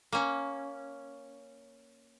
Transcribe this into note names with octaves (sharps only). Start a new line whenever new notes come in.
A#3 C#4